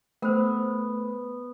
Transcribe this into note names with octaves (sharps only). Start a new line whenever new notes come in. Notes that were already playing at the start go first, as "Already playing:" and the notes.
A3 B3 A#4 C5